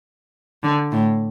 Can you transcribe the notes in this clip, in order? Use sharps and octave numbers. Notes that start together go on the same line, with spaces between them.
D3
A2